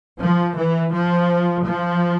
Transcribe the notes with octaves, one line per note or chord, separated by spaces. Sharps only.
F3
E3
F3
F3